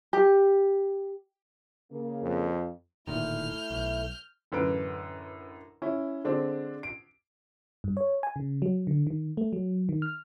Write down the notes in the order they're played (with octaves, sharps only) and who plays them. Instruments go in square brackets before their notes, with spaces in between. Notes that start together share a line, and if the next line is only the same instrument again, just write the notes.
[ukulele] G4
[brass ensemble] C#3 A#3
[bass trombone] F2
[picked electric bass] D1 A#2 D#3 [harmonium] A3 E4 [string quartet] F6 G6
[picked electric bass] B1
[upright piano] A1 F#2 D3 B4 D7
C#4 E4
D3 G#3 C4 D4
D7
[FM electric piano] G2
C#5
G#5
C#3
F#3
D3
D#3
A3
F#3
D#3
F6